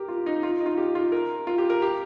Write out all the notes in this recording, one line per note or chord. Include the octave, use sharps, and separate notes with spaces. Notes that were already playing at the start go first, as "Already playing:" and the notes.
Already playing: G4 A#4
F4
D#4
F4
D#4
F4
G4
F4
A#4
F4
G4
A#4
G4